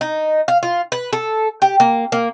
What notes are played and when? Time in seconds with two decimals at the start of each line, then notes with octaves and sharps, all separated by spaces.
0.01 D#4
0.48 F5
0.63 F4
0.92 B4
1.13 A4
1.62 G4
1.80 A#3
2.12 A#3